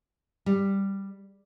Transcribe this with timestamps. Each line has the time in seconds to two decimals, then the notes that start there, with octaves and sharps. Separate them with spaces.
0.46 G3